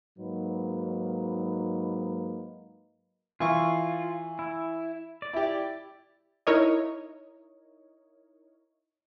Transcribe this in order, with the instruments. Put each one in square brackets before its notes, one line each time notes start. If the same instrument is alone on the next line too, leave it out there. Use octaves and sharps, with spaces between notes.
[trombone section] G#2 F#3 A#3 D#4 B4
[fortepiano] E3 C#6 [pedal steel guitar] F4
[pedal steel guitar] E4
D5
[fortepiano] E4 G4
[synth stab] D#4 E4 A#4 C#5 D#5